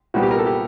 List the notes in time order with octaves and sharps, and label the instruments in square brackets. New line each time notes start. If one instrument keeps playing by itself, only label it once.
[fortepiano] C2 A#2 G3 B3 F#4
G4
A#4
A4
G4